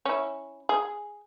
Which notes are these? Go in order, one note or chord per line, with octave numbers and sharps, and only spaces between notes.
C#4 E4
G#4